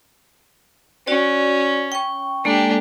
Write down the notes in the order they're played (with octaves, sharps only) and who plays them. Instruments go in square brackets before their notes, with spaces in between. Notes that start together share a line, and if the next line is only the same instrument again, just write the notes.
[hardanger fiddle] C#4 [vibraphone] F#4 D5
[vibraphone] G5 C#6
[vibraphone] G#3 A#3 A4 [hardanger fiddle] D4 G4